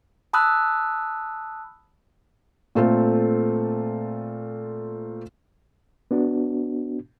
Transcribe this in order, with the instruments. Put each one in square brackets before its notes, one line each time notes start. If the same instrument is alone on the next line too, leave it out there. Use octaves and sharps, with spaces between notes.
[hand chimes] A5 B5 D#6 E6 F#6
[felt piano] A#2 A3 C4 F4 A4
[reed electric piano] B3 D4 F#4